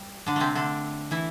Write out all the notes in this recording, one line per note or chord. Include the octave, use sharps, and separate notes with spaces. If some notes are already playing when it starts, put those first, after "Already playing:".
Already playing: G3
D3 D4
C3 A3 C4
D3 D4
E3 E4